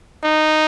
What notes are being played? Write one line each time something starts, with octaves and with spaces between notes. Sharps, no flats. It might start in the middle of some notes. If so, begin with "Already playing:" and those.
D#4